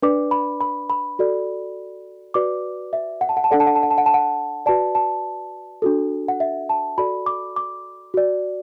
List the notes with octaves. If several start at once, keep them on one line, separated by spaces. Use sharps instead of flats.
D4 B4 D5 D6
B5
B5
B5
F#4 A4 D5
F#4 B4 D5 D6
E5
F#5
A5
F#5
A5
D4 A4 D5 F#5
A5
F#5
A5
F#5
A5
F#5
A5
F#5
F#4 B4 D5 A5
A5
D4 F#4 A4
F#5
E5
A5
F#4 A4 D5 B5
D6
D6
F#4 D5